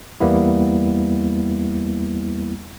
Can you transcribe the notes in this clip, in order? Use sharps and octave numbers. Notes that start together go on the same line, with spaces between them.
E2 G3 A#3 B3 E4